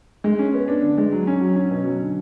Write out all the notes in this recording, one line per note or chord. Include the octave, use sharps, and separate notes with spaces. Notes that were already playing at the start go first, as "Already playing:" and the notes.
G#3
C#4
B3
D4
D3
G#3
F#3
C#4
F#3
C#4
B2
F#3
D3